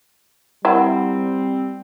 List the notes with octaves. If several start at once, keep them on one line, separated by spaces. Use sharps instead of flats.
G3 C4 E4 A#4 E5 F#5 A#5